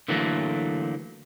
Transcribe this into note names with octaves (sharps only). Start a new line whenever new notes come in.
D3 E3 F#3 A3 A#3